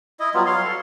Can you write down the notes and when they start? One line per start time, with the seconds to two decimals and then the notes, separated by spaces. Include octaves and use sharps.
0.20 E4 D#5
0.34 F#3 G3 B3 F4
0.46 C#5 F5 C6
0.64 A4